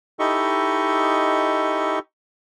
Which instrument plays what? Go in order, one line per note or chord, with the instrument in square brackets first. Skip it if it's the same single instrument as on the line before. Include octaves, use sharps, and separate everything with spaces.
[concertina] D#4 E4 G4 A4 D#5 C#6